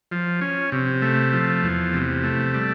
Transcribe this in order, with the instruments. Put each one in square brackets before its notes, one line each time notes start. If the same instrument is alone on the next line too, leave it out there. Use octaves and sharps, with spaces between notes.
[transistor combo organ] F3
C#4
C3
A3
F3
E2
C3
A3
G3